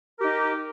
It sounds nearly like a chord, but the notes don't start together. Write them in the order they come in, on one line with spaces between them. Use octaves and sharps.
A#4 G4 D#4